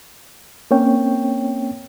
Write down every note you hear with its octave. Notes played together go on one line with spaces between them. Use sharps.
A#3 C4 C#4 C#5 G5